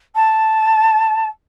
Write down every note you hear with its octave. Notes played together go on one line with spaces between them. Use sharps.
A5